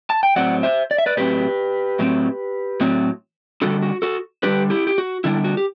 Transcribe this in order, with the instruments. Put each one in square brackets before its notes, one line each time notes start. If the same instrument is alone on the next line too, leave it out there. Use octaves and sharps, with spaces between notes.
[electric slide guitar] A5
G5
A2 F#3 C4 D5 F#5
C5 E5
D5
E5
B4 D5
A2 F#3 C4 G4 B4
A2 F#3 C4
A2 F#3 C4
D3 G3 D4 F#4 A4
F#4
F#4 A4
D3 G3 D4 G4 B4
E4 G4
G4
F#4
D3 G3 D4 E4
F#4
G4